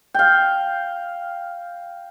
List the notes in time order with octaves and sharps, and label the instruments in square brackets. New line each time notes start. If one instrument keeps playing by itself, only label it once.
[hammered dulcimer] F5 G5